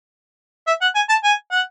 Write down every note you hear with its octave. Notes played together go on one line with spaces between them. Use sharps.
E5
F#5
G#5
A5
G#5
F#5